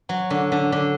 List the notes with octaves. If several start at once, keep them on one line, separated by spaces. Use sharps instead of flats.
F#3
D3
D3
D3